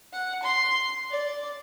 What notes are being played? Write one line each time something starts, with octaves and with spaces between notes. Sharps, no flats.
F#5
C6
D5